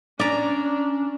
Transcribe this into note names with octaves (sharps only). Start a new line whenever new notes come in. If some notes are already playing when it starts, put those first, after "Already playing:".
C#4 D4 D5 A#5